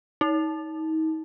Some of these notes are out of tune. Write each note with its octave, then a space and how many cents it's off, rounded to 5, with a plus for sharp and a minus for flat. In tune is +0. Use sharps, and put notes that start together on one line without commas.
D#4 +35